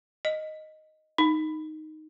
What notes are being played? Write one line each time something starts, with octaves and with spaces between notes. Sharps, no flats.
D#5
D#4